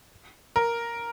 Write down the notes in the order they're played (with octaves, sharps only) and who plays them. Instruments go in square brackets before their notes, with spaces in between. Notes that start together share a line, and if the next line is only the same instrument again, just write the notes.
[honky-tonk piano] A#4